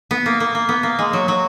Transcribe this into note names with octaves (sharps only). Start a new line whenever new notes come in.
B3
A#3
A#3
A#3
B3
A#3
G#3
F#3
F#3